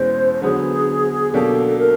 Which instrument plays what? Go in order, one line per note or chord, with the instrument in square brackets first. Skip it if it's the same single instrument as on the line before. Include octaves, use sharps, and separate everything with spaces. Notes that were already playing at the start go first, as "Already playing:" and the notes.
Already playing: [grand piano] E2 B2 G#3 C#4 E4 [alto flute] C5
[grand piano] D3 F#3 B3 [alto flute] G#4
[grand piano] B2 F#3 A#3 D4 G4 [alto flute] A4
[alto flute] A#4